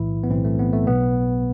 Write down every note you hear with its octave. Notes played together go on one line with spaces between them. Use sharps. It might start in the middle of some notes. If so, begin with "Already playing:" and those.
Already playing: B1 A2 E3 E4
B3
B1 A2 E3 C4
A3
B3
A3
B1 B2 B3